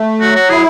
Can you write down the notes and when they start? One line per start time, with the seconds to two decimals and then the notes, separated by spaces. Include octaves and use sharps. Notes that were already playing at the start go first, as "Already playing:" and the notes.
Already playing: A3
0.20 F#3 F#4
0.35 F#4
0.50 E4 G#4